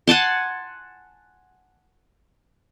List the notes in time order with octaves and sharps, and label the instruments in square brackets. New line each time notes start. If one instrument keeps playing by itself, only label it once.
[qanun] F#5 G#5 A5 C6